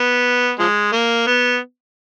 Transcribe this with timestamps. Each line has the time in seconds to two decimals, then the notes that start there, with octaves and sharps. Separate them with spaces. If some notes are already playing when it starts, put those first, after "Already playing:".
Already playing: B3
0.59 F3 G#3
0.92 A#3
1.27 B3